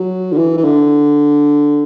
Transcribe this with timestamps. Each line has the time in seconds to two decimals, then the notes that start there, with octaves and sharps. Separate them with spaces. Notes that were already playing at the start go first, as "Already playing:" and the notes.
Already playing: F#3
0.32 D3
0.38 E3
0.58 E3
0.64 D3